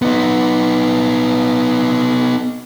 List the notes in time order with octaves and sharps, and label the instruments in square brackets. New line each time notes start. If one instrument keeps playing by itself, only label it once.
[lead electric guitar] B3 D#4